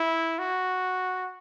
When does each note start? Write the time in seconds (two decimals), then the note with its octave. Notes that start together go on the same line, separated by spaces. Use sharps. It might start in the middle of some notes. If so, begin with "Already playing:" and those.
Already playing: E4
0.39 F#4